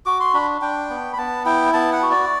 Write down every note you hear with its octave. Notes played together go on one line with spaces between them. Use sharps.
F#4 D6
C6
D4 B5
D4 G5
B3
B5
B3 A5
E4 G5
B3 A5
F#5
F#4
D5